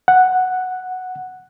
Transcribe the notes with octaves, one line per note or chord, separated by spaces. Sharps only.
F#5